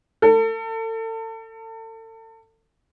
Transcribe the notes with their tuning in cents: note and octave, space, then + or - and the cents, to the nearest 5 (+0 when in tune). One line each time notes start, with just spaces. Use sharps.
A4 +35